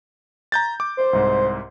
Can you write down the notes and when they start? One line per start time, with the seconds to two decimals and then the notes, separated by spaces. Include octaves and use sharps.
0.52 A#5 G6 A6
0.80 D6
0.97 C5
1.13 C2 G#2